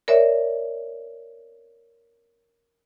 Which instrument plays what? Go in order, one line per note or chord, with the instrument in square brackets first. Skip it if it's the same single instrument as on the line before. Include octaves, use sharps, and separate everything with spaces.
[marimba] A#4 C#5 D5 E5